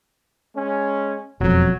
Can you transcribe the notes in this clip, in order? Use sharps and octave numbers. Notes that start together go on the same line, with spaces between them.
G#3 C#4
E1 F2 F#3